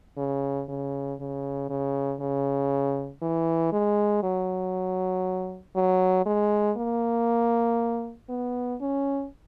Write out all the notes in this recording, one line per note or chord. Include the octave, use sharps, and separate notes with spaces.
C#3
C#3
C#3
C#3
C#3
E3
G#3
F#3
F#3
G#3
A#3
B3
C#4